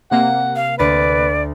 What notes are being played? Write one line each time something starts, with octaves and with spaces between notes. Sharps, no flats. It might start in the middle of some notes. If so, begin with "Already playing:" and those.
C3 A#3 F#5
F5
D2 B4 D5 A6